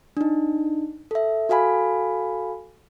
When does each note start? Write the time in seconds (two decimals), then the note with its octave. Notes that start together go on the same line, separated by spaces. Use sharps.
0.17 D4 D#4
1.11 A4 E5
1.49 F#4 A4 F5 G#5 B5